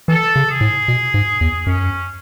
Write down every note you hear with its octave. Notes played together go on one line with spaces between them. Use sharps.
E3 A4
C#3
G#4
A2
B2
G#2
E2
F#2 C#4